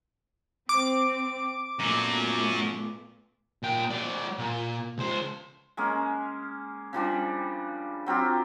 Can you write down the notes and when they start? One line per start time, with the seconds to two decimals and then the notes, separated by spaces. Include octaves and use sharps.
0.69 C4 D6
1.79 F#2 A#2 F#3 A3 B3
3.63 A#2 G5
3.91 F#3 D5
4.38 A#2
4.98 C#2 C5
5.77 G#3 A#3 C#4
6.93 C#3 F3 G3 D4
8.06 F#3 C4 F4 G4